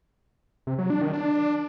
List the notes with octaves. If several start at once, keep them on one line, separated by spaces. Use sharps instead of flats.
C3
F#3
D4
D#3
D4